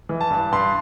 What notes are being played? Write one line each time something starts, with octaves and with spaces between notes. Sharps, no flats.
E3
A5
G2
G2 C6